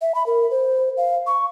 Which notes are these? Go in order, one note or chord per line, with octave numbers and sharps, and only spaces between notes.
E5
B5
A#4
C5
F5
C#6